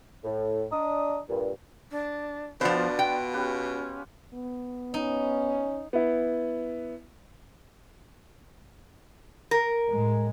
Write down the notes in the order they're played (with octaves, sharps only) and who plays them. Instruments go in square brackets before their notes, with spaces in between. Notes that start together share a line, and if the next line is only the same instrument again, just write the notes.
[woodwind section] A2
D4 D#5 A#5 D#6
G2 A#2
[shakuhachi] D4
[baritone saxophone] B2 [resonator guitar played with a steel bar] F3 C5 [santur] B3 F4 [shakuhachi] D4
[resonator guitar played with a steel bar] G5
[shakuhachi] C#4 [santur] G4 B4
[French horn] B3
[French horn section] C#4 [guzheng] D#4
[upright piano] B3 E4
[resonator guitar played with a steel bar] A#4
[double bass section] A2 G#3